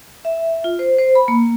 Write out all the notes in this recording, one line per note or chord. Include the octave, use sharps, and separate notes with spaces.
E5
F4
C5
C5
B5
A#3